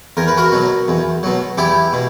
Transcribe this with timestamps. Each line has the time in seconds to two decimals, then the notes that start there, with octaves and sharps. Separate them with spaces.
0.17 E2 A#4
0.28 B4
0.37 F#4 A#4
0.52 B2 F#3
0.88 E2
1.23 B2 F#3
1.58 E2 E4 G4
1.93 B2